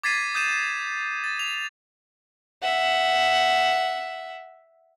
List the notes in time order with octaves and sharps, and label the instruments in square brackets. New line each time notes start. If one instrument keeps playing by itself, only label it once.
[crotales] D6 G#6 A6 B6 C7 D#7
D#6 G6 D#7 E7
A6
F7
[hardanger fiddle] E5 F#5